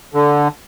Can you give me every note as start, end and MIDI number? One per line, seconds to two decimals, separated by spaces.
0.14 0.48 50